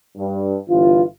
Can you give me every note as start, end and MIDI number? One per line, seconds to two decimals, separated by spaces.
0.18 0.56 43
0.69 1.02 31
0.69 1.02 52
0.69 1.02 65